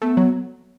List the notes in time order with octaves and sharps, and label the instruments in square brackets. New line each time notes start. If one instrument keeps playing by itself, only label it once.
[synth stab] A3 [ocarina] B3
[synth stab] F#3